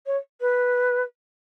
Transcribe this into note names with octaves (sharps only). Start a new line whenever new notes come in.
C#5
B4